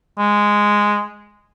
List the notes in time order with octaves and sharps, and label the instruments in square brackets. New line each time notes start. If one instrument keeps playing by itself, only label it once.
[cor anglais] G#3